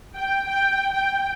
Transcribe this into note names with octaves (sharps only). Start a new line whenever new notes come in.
G5
G5
G5